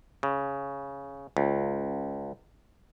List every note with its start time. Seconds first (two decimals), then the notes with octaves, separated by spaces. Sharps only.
0.23 C#3
1.37 C#2